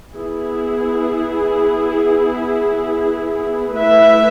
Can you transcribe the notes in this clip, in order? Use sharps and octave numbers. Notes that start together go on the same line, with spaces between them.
B3 E4 G#4
A3 E4 B4 E5